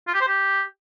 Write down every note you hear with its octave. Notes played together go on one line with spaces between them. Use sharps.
F4
G4
C5
G4